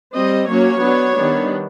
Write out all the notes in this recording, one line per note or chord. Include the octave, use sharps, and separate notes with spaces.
G3 C4 D#5
F#3 A#3 C#4 C#5
F#3 B3 D4
D#3 G3 B3 D4